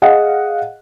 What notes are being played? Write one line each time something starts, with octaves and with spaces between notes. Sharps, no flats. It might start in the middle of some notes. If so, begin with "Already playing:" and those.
G#4 D#5 F5 F#5